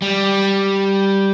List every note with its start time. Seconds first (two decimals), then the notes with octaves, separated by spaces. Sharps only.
0.02 G3